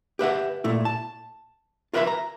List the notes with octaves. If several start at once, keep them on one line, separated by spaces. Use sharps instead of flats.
G4 B4 E5 F#5
A#2 A3 E4
A5
F4 A#4 B4 D#5 E5 B5
A#5